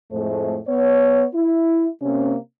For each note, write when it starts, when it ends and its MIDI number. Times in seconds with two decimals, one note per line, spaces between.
0.11 0.57 41
0.11 0.57 45
0.11 0.57 56
0.11 0.57 57
0.11 0.57 72
0.68 1.25 59
0.68 1.25 73
1.33 1.87 64
2.02 2.35 48
2.02 2.35 58
2.02 2.35 60
2.02 2.35 61